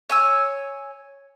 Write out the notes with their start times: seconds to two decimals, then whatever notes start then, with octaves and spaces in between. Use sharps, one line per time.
0.10 C#5 G#5 E6